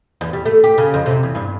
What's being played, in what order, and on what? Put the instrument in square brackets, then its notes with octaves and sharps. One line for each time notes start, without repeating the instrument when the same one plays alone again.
[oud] E2
G3
A3
G4
C#3
F2
C3
E2
G2